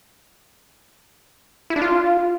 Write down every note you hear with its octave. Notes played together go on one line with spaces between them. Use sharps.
E4
D4
F4